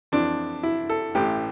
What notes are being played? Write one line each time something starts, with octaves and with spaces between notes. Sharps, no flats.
F2 E3 D4
E4
A4
A1 A2 E3 G4